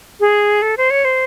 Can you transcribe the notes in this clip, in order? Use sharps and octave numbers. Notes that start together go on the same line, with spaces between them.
G#4
A4
C5
C#5
C5